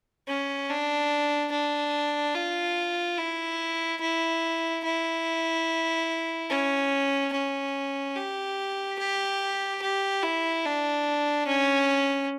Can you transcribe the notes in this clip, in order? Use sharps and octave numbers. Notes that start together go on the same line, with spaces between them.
C#4
D4
D4
F4
E4
E4
E4
C#4
C#4
G4
G4
G4
E4
D4
C#4